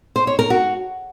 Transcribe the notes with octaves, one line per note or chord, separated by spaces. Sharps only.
C5
C#5
A#4
F#4